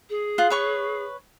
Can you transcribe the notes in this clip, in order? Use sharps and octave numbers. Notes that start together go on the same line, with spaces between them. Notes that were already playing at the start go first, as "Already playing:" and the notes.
G#4
F4 F#5
B4 C#5 C#6